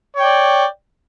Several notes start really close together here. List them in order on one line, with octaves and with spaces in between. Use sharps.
C#5 G5 D5